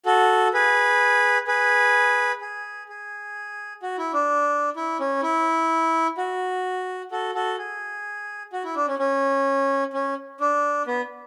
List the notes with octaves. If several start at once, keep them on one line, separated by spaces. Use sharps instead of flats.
F#4 A4
G#4 B4
G#4 B4
G#4
G#4
F#4
E4
D4
E4
C#4
E4
F#4
F#4 A4
F#4 A4
G#4
F#4
E4
D4
C#4
C#4
C#4
D4
B3